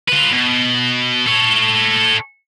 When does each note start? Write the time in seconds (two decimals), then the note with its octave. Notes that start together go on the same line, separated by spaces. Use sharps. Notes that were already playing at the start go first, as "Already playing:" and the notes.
0.08 F4 B4
0.32 B2
1.26 A4 C#5